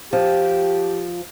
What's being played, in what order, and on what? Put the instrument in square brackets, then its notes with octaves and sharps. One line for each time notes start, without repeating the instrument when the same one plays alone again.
[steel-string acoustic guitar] F3 [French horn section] G4